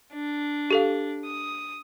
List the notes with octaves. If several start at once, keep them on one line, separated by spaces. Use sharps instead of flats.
D4
G4 A4 F5
D#6